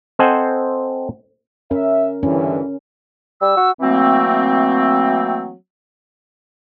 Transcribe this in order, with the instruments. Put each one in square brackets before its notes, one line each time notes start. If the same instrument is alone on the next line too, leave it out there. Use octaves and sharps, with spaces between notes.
[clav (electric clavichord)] C4 A4 C5 D#5 F#5 G#5
[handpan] C#4 A#4 [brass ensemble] E5
[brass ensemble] G2 D3 E3 [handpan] C#4
[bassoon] G3 [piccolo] E6
[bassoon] F#4
[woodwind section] E3 F#3 A3 A#3 C4